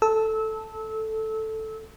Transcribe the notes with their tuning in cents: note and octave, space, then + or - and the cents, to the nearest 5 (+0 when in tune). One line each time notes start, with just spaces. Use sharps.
A4 +0 E6 -25